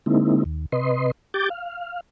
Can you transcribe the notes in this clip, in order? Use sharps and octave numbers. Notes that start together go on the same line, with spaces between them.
D3 G#3 A#3 C4 D#4 E4
D#2
C3 B4 D#5 C6
G4 D6 G6 A6
F5